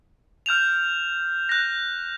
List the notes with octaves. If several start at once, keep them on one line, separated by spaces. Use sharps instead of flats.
F6 G6 E7 F7
F#6 A#6